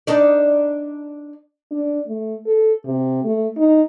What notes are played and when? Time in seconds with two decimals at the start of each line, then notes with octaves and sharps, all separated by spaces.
0.07 D4 D#4 D5
1.71 D4
2.08 A3
2.46 A4
2.85 C3
3.24 A3
3.57 D#4